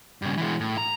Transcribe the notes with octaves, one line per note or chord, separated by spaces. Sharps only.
G2 C#3
E3 G#3
A2
A#5